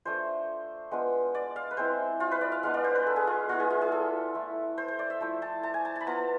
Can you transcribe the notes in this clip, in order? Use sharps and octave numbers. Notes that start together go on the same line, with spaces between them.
A3 D4 F4 C5
G#3 B3 D4 F4
D5
F5
B4
G#3 C4 E4 C5
F4
B4
D5
F5
G#3 B3 D4 F5
D5
C5
B4
A4
G#4
F4
B3 E4 F4
G#4
F4
G#4
A4
A3 E4
C5
C5
D5
E5
F3 A3 E4
A5
A5
G#5
A5
A5
B5
B3 F4 A5